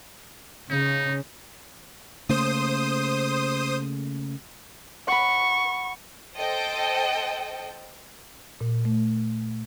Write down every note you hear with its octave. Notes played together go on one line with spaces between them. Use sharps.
C#3 D#4
C#3 A3 A#3 C5 D#6
F#5 B5 C#6
A4 C5 D#5 G5
A#2
A3